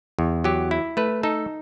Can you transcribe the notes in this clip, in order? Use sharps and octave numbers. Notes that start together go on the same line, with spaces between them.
E2
F#3 G4
E4
A3 B4
D#4 A4